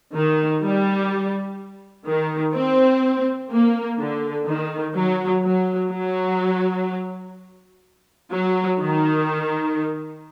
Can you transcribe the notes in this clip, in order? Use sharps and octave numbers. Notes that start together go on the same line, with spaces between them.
D#3
G3
D#3
C4
A#3
D3
D#3
F#3
F#3
F#3
F#3
D#3